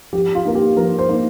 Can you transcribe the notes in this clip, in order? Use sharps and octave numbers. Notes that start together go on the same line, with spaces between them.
F3 G4
F4
A#3 D#4 A#4
G4
F3 A#4
C5
A#3 D#4